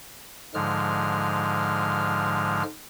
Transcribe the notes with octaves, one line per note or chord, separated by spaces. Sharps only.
G#2 D3 F3 G#3 F6